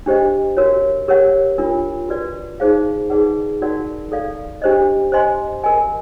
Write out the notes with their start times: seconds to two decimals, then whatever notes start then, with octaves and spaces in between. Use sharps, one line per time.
0.06 D4 G4 C5 D#5
0.57 F#4 A#4 C#5
1.08 G4 A#4 C#5 F#5
1.58 D4 F4 A#4
2.08 F#4 B4 D5
2.60 D#4 G#4 C5 F5
3.10 D#4 G#4 B4 D5 F#5
3.61 D#4 F#4 A#4 D5 F#5
4.12 A4 D5 F5
4.62 D4 G4 C5 D#5
5.12 C5 D#5 G#5 C6
5.64 A#4 D#5 G#5